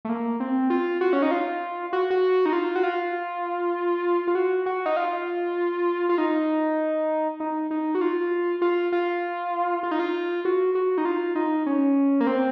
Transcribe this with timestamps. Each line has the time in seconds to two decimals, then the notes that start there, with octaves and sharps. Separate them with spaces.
0.05 A3
0.09 A#3
0.40 C4
0.70 F4
1.01 F#4
1.13 C#4
1.22 D#4
1.31 F4
1.93 F#4
2.10 F#4
2.46 D#4
2.53 F4
2.76 F#4
2.83 F4
4.27 F4
4.35 F#4
4.66 F#4
4.86 D#4
4.97 F4
6.09 F4
6.18 D#4
7.40 D#4
7.71 D#4
7.95 F#4
8.01 F4
8.62 F4
8.92 F4
9.83 F4
9.91 D#4
9.99 F4
10.45 F#4
10.75 F#4
10.98 D#4
11.05 F4
11.35 D#4
11.66 C#4
12.20 A#3
12.27 C4